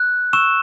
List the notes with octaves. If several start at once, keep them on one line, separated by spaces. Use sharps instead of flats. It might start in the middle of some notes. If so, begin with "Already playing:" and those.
Already playing: F#6
C#6 E6 E7